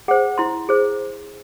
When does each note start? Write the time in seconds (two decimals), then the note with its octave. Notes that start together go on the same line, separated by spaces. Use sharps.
0.08 G#4 C5 F#5
0.38 E4 C6
0.69 G#4 C5